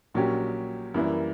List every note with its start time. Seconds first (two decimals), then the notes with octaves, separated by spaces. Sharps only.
0.14 A#1 A#2 F#3 C#4 G4
0.94 F#2 E3 G3 A#3 E4